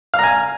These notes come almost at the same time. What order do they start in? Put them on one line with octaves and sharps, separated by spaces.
F5 A#5 G#5